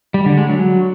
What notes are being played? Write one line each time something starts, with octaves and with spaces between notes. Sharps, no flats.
G3
D3
G#3
F#3